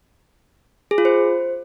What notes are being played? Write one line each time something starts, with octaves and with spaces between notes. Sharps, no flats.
G#4
F4
C5